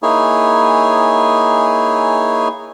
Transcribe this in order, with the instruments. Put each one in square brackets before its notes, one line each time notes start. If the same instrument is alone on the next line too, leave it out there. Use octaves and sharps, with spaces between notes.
[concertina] A#3 D#4 E4 G#4 C#5 G#5